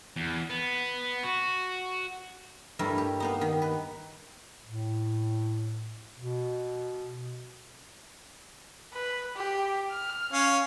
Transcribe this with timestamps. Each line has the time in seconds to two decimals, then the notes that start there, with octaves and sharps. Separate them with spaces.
0.16 E2
0.50 B3
1.24 F#4
2.79 G2 G3 A3 E4 A#4
2.98 G4
3.20 A#3 B3 D#4
3.41 D#3
3.62 B4
4.65 A2
6.16 B2
8.93 B4
9.36 G4
9.91 F6
10.33 C#4 F5